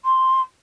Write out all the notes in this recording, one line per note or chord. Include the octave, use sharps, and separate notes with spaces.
C6